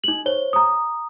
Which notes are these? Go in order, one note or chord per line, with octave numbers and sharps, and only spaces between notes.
D#4 F#7
C5 C#5 G7
A#5 D#6